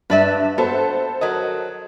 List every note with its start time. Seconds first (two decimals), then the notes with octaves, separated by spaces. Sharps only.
0.10 G2 B4 D5 E5
0.58 B3 A4 C5
1.21 F#3 A#4 D#5